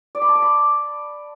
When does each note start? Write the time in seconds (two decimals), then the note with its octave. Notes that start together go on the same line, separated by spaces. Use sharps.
0.15 D5
0.22 B5
0.28 A5
0.35 D6
0.42 B5